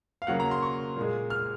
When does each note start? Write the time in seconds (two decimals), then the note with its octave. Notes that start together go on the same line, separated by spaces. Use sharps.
0.22 F5
0.27 C#3 F#3 A#3 F#5
0.40 A#5
0.51 C6
0.63 C#6
0.97 A#2 G#3
1.30 F6